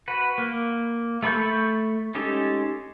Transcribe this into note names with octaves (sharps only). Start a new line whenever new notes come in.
F#4 B4
A#3
A3 A4 B5 C#6 G6
G#3 C#4 D#4 G4 A4